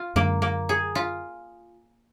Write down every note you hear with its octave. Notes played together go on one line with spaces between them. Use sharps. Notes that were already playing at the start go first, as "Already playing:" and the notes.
Already playing: F4
F#2 D3 G#3 A#3 D4
A#3
G#4
F4